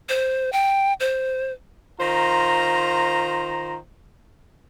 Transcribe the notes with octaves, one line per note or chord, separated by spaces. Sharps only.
C5
G5
C5
D#3 F4 C5 A#5